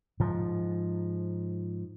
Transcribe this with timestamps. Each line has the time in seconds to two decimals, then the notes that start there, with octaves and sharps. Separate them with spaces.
0.20 G#2 F3